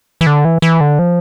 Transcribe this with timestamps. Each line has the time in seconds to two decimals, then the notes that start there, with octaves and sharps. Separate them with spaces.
0.21 E3
0.27 D3
0.45 E3
0.62 E3
0.81 D3
0.99 F3